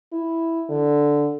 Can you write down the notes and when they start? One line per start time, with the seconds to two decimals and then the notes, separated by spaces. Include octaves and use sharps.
0.12 E4
0.69 D3